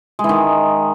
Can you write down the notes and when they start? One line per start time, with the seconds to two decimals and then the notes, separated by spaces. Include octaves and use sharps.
0.19 G#3
0.24 E3
0.29 D#3